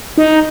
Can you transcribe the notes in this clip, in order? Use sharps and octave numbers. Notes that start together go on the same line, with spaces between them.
D#4